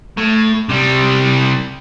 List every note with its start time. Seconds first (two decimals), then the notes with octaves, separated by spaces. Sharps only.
0.17 A2
0.69 C3 G3